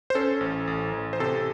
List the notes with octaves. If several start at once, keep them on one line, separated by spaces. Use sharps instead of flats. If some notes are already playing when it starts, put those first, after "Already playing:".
C5
C#4 A4
A1
A1
A1
C5
C3 A4